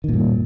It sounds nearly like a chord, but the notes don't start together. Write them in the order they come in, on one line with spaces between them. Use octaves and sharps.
D#3 A#2 G2